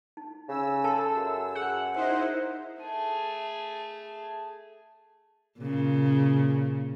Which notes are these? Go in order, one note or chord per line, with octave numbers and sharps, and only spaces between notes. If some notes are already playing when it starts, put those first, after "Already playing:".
D#4
C#3 E6
A4 A5 C6
F#2 F#4
G#4 F#5
D#4 E4 C5 E5
A3 G#4
A#2 C#3